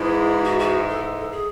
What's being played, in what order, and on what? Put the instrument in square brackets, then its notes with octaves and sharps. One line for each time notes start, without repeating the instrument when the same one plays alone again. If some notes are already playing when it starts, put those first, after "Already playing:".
Already playing: [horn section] G#2 E3 G#3 [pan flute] E4
[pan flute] F#4
F#4
A4
A4
G#4